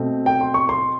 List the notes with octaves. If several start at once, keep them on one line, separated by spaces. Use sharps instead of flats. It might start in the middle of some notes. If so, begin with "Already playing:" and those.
Already playing: B2 A3 C4
G5
C6
C#6
C6